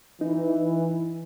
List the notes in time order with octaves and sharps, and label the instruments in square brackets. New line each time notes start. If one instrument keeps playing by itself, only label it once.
[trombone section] E3 [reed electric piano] D#4